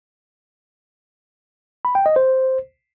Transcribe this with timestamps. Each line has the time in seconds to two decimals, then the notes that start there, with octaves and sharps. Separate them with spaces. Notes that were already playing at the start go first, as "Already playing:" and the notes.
1.85 B5
1.95 G5
2.06 D#5
2.16 C5